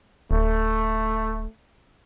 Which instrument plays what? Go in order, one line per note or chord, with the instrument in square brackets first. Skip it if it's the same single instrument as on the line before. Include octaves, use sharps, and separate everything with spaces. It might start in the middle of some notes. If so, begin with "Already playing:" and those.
[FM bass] D1 [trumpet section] A3